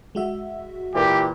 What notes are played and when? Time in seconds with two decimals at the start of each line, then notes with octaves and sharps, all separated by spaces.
0.15 G#3 F#4 E5
0.95 A#2 E3 G4